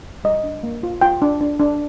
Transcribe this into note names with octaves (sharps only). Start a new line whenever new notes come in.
G3 D#5
D4
A#3
F4
F4 G5
D4
D4
D4